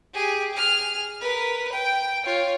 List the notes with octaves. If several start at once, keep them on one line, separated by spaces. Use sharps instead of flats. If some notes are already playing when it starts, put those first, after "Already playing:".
G4 G#4
G#4 F6
A#4 B4
G5
F4 C#5